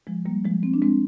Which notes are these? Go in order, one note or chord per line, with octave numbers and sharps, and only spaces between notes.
F3 G#3
G3 A#3
F3 G#3
C4
D4
G#3 C4